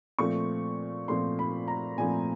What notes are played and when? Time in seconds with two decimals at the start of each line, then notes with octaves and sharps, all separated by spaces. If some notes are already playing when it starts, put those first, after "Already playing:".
0.19 A#2 F3 A3 C4 C#6
1.08 A#2 F3 A3 C4 C6
1.39 B5
1.68 A#5
1.98 A#2 F3 A3 C4 G#5